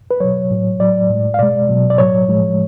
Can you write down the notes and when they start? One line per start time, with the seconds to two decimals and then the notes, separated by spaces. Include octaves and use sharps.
0.11 B4
0.20 B2 F#3 C#5
0.51 A2 F#3
0.79 A2 F#3 D5
1.10 A2 G#3
1.34 F5
1.39 B2 G#3 D5
1.69 B2 F#3
1.90 D5
1.98 A2 F#3 C#5
2.28 A2 F3 G#3